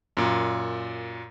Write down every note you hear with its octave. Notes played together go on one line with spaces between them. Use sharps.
F#2 A#2